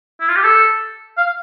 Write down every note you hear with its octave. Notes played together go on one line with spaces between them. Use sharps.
E4
F4
G4
A4
F5